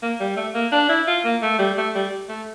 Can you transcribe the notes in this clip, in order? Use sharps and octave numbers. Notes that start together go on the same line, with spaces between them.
A#3
G3
A3
A#3
D4
E4
F4
A#3
A3
G3
A3
G3
A3